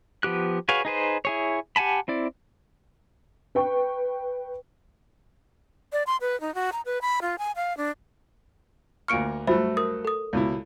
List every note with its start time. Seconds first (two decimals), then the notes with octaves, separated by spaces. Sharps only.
0.23 F3 B3 G4 F#6
0.69 F#4 G#4 B4 C#5 F5
0.85 D#4 G#4 B4 C5
1.25 E4 G#4 C#5
1.76 G4 F#5 G#5 A5 B5
2.08 C4 E4 D5
3.55 B4 G5 C#6
5.92 D5
6.07 C6
6.21 B4
6.41 D#4
6.55 F#4
6.72 A#5
6.85 B4
7.02 B5
7.22 F4
7.39 G#5
7.56 F5
7.77 D4
9.08 D2 A#3 C#6 F6 C#7 D7
9.47 G2 F#3 A3 C5 E5 B5
9.77 A#4 D#6
10.05 A4 D#6
10.33 C#2 B2 E4